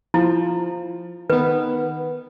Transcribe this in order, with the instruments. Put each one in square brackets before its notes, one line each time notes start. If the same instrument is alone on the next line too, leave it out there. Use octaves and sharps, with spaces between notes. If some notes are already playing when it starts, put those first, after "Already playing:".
[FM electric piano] F3 [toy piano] E4
[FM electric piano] D#3 B3 [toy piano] B4